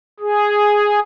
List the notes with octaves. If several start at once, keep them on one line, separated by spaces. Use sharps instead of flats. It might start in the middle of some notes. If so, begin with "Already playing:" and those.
G#4